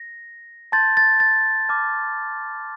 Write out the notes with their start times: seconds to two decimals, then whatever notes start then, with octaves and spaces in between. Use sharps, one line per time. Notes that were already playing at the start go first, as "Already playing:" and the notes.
Already playing: A#6
0.72 A5 C6 G6 A6
0.97 A6
1.20 A6
1.69 A5 D6 F6